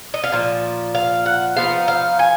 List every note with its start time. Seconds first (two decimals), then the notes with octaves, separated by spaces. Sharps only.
0.14 D#5
0.24 F5
0.32 A#2 F3
0.95 F5
1.26 F#5
1.57 F3 B3 D#4 F5
1.88 F5
2.19 G#5